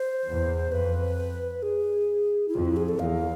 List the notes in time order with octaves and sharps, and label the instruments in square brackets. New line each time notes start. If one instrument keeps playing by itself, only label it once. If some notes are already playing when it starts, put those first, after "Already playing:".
Already playing: [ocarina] C5
[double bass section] E2
[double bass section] F2 [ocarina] B4
[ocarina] G#4
E4
[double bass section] F2 [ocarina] F4
[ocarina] E4
G#4
A4
[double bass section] E2 [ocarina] F5